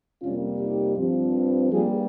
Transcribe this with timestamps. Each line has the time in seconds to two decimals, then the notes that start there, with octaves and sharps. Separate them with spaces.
0.22 F2 C3 G3 A#3 C#4 F4
0.59 D#4 G4
0.96 G2 F3 C4
1.71 G2 G3 A#3 F4 G#4